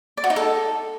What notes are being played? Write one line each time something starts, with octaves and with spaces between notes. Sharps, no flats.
D5
F#4
D#4
A4